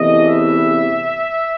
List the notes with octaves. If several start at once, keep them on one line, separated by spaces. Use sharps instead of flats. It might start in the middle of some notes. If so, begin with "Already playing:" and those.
Already playing: E2 C3 E3 A3 D#5
E5